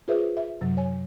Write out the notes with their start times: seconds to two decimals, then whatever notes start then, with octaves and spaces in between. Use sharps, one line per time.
0.08 F4 G#4 B4 C5 E5
0.37 E5
0.61 F#2 C3 F#3
0.77 C#5 G#5